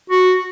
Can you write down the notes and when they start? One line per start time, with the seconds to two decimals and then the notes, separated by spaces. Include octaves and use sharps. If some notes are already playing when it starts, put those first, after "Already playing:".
0.10 F#4